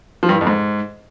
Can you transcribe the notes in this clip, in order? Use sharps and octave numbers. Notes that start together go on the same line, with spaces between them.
F3
G2
E3
F2
G#2